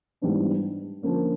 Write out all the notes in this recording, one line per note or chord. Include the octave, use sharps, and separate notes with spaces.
G#2 E3 G3 B3 D4
D3 F3 A#3 C#4